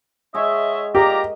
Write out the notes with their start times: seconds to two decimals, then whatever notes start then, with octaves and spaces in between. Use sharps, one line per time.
0.35 G#3 F#4 C#5 D#5 E5 D6
0.95 F4 G4 A#4 D5 D#5 A#5